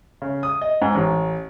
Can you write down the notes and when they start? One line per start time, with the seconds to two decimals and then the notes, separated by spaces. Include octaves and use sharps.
0.22 C#3
0.43 D#6
0.61 D#5
0.82 G#2
0.95 A1